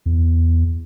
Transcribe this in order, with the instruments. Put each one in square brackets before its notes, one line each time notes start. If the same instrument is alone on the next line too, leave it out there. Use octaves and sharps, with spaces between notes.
[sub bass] E2